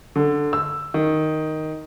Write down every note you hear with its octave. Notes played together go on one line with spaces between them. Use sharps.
D3
E6
D#3